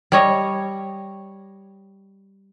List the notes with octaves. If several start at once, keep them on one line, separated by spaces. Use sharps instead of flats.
G3 C#5 D#5